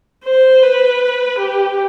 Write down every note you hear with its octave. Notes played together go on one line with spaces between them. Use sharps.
C5
B4
G4